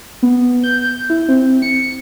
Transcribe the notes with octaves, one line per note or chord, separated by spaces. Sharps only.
B3
G6
E4
C4
C#7